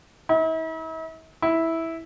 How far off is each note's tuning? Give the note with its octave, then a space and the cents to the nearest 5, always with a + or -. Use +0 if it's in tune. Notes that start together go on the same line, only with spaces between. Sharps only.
E4 -45
E4 -10